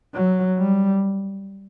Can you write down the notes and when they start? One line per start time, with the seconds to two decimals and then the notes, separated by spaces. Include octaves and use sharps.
0.14 F#3
0.58 G3